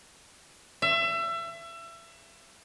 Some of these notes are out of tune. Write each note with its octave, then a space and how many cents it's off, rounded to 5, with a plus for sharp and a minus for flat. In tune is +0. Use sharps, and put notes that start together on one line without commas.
E5 +30